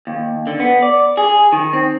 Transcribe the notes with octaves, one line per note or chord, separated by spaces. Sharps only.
D#2
D3
B3
D5
G#4
D#3
C4